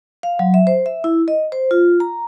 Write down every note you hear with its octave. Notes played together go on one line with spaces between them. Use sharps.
F5
F#3
E5
C5
E5
E4
D#5
C5
F4
A#5